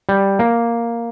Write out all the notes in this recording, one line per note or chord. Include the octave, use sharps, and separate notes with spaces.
G3
A#3